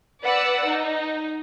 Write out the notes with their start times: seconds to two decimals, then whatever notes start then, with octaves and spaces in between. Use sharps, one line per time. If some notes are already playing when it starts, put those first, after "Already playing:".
0.24 B4 D5 F#5 E6
0.69 D#4